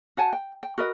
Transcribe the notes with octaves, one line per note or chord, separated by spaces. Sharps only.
F#4 F#5 G#5 A5
G5
G5
F#4 A#4 B4 D#5